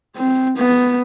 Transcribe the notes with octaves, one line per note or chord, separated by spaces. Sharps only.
C4
B3